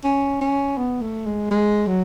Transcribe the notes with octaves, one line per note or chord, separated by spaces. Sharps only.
C#4
C#4
B3
A3
G#3
G#3
F#3